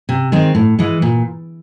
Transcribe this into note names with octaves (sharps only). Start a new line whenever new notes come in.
C3
D#3 G#3 C4
A2
E3 G#3
A#2